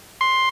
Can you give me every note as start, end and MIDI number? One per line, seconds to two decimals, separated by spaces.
0.21 0.49 84